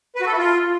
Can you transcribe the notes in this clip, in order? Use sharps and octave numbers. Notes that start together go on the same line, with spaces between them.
B4
F#4
A4
E4
F4